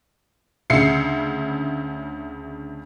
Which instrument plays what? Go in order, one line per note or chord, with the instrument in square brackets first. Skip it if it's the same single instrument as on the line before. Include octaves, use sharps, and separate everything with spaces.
[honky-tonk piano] D2 C#3 E5 C7 C#7